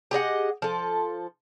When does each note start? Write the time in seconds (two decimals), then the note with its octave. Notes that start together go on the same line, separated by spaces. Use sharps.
0.11 G4 G#4 D#5 F#5
0.62 F3 A4